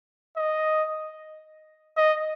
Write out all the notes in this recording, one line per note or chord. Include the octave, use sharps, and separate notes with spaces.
D#5
D#5